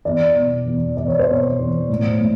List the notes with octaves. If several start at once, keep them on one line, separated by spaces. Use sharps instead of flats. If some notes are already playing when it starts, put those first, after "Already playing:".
E2 D5
B2
E2
E2 D5
C#5
C5
B2 C#5
E2
A2
A2